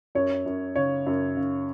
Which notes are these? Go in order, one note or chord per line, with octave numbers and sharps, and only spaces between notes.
F#2 C#5
F#2
C#3 C#5
F#2
C#3